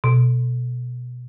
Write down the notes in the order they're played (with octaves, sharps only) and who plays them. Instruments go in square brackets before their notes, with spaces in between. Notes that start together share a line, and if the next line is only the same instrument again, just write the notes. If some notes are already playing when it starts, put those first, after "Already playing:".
[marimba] B2